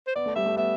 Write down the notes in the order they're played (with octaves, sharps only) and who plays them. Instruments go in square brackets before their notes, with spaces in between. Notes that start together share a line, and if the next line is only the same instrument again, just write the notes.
[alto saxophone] C5
[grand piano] B3 [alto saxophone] D5
[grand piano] A3
[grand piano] G3 [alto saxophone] E5
[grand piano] A3
[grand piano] B3 [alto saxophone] E5